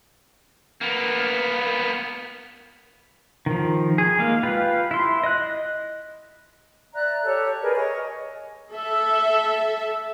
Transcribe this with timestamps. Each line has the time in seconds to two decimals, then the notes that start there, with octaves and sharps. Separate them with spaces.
0.81 A#3 B3
3.46 D#3 F3
3.98 G#4
4.19 G#3 A#3 F5
4.43 F4 G4 B4 F5
4.91 E4 C6
5.24 D#5 F#6
6.94 D5 E5 A#5 F#6
7.24 G4 A4 C#5
7.62 G#4 A#4 B4 D5
7.75 C#5 D#5 G#5 C#6
8.72 A4 E5